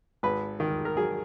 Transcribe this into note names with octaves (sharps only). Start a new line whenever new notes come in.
G#1 B4
D#3
A#4
F#3 G#4